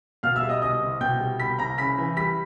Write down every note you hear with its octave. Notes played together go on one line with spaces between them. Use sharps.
B2 F5 F6
E5 E6
G3
D#5 D#6
C2 D#5 D#6
C2
B2 G5 G6
G3
C2 B5 B6
C2 A#5 A#6
C#3 B5 B6
E3
G3 B5 B6